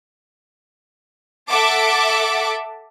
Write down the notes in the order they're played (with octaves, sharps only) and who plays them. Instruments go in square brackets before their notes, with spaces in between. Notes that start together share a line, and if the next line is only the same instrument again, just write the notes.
[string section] A4 E5 F#5 A5 D6